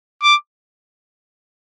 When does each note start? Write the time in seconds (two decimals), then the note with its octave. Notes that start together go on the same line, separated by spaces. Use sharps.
0.23 D6